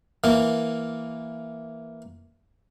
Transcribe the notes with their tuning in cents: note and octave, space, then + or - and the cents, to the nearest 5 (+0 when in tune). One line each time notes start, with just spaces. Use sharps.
E3 +0 A#3 +0